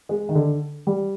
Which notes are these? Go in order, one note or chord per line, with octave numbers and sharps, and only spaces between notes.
G#3
D#3
D3
G3